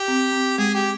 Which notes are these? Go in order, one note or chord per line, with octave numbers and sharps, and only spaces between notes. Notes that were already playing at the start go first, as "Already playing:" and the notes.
Already playing: G4
C4
C4
G#3 G#4
G4